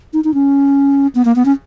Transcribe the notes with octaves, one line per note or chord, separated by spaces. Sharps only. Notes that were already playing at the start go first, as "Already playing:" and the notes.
D#4
D#4
C#4
B3
A#3
B3
C#4